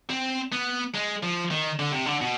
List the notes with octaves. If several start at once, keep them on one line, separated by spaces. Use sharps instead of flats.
C4
B3
G#3
F3
D#3
D3
C3
D3
B2